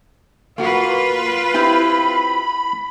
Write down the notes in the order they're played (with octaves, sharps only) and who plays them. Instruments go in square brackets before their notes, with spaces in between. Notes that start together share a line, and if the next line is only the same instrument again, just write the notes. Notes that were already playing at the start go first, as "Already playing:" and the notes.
[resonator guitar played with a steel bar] A#3 F#4 A#4 [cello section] F4 B4
[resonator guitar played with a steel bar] C4 E4 G4 [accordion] B5